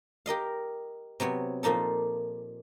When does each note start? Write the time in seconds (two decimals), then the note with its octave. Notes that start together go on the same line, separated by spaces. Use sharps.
0.26 G4 A#4 D#5 F5
1.20 C3 F#3 B3 C#5
1.63 A#2 F3 A#3 D#4 A4